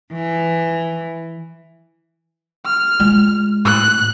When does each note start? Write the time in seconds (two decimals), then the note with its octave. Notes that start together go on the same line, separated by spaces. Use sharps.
0.13 E3
2.66 F6
3.00 G#3 F4
3.65 A2 F#6